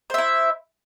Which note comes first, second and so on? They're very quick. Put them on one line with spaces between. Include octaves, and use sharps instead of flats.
C5 E5 E4